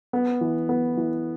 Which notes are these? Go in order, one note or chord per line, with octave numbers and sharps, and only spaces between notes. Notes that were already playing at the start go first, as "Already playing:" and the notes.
B3
E3
B3
E3